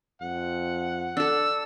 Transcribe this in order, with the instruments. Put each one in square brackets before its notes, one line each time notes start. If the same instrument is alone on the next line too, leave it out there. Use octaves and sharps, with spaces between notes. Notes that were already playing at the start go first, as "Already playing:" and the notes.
[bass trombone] F2 [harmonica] F#5
[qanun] D4 A4 [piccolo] E6